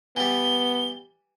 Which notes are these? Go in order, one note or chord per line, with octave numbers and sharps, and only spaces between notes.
E3 G3 B3 G7